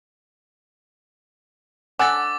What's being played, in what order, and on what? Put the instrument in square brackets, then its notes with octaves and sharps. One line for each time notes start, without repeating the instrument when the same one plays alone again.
[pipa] D3 F#5 [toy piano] G#5 E6 [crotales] D6 A6